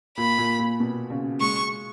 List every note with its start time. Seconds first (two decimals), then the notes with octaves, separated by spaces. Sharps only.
0.17 A#2 B5
0.38 A#2
0.59 A#2
0.80 B2
1.10 C#3
1.41 G#3 C#6